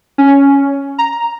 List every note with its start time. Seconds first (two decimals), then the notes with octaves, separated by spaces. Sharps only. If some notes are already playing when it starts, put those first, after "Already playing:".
0.18 C#4
0.98 A#5